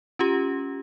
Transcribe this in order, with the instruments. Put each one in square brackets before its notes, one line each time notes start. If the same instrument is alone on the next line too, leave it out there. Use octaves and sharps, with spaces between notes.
[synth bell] C#4 F4 G4